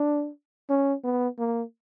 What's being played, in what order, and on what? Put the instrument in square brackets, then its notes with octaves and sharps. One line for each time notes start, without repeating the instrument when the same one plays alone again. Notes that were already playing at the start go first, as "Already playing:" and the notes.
Already playing: [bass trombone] D4
C#4
B3
A#3